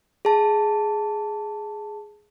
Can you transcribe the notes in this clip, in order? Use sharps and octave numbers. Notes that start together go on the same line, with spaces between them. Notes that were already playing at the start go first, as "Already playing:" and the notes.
G#4 A5